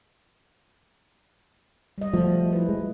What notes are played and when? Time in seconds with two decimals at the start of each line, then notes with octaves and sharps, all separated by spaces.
1.98 G3 D#5
2.13 F3 A3 F#4
2.53 E4 B4
2.69 G#3